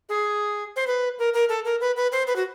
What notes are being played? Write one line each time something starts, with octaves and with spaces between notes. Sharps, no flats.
G#4
C5
B4
A#4
A#4
A4
A#4
B4
B4
C5
B4
F#4